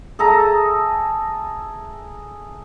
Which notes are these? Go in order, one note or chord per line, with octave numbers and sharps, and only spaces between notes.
G#4 A4 E5 A#5